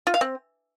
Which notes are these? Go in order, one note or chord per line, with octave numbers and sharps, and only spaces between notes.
F4
F5
C4